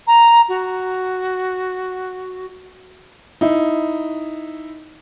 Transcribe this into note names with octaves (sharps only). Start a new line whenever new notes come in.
A#5
F#4
D#4 E4